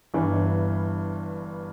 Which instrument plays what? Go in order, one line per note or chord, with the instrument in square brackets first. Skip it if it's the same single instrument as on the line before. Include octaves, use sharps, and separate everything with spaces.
[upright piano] G1 G2 E3